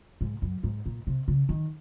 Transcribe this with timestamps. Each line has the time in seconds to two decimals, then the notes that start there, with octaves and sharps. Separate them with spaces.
0.21 G#2
0.42 F#2
0.63 G#2
0.86 A#2
1.07 C3
1.28 C#3
1.49 D#3